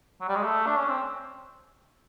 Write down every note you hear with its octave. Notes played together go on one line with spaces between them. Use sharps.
F#3
G3
G#3
A3
D4
C#4
C4